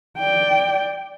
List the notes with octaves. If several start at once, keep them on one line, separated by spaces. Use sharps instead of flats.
D5 G5